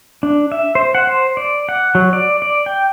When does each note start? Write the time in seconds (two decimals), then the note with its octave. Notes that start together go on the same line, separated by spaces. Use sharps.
0.23 D4
0.52 E5
0.75 C5
0.95 F#5
1.07 C5
1.37 D5
1.69 F#5
1.95 F#3
2.13 D5
2.42 D5
2.66 G5